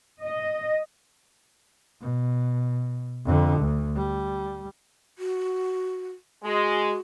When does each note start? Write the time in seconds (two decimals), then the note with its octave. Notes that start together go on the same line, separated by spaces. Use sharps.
0.22 D#5
2.01 B2
3.26 F2 D3
3.60 D2
3.96 G3
5.18 F#4
6.44 G#3 F#4